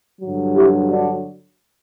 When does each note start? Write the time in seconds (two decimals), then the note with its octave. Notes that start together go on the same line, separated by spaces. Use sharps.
0.21 G2 D3 F#3
0.55 E4 G4
0.90 D4 F#4